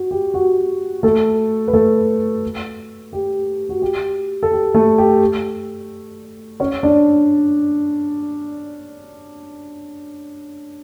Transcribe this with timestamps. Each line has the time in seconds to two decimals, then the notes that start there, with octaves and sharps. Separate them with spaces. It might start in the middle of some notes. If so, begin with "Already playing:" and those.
Already playing: F#4
0.11 G4
0.34 F#4
1.03 A3 A4
1.68 B4
1.73 A3 A4
3.13 G4
3.69 F#4
3.82 G4
4.43 A4
4.52 G4
4.74 A3 A4
4.98 G4
6.60 C#4 C#5
6.83 D4 D5